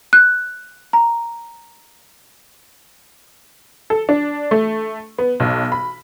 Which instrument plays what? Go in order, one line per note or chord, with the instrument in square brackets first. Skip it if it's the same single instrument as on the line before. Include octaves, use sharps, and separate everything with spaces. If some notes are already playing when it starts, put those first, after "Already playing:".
[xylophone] F#6
A#5
[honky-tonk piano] A4
D4
A3
B3
B1
B5